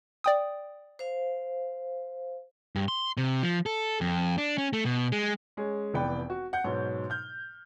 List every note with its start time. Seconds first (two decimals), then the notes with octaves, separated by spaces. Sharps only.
0.24 D5 G5 D#6
0.99 C5 F5
2.76 G2
2.88 C6
3.17 C3
3.43 F3
3.66 A4
4.01 F2
4.38 D4
4.58 C#4
4.73 A3
4.85 B2
5.12 G#3
5.57 G#3 C#4 G#4
5.94 F1 E3 B3 B4 D5 G5
6.30 F#4
6.53 F#5 G6
6.64 G#2 B2 F#3
7.10 F6 G6